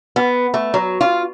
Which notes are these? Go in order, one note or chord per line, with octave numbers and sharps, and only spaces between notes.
B3
A3
F#3
F4